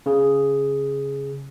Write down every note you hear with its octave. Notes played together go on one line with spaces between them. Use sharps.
C#3 G#4